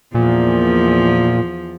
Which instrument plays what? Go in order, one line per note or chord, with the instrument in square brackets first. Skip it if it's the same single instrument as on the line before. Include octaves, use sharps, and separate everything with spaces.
[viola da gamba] E2 F3 [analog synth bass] A#2